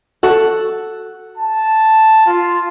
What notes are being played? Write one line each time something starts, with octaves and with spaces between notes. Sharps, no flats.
F#4 A4
A5
F4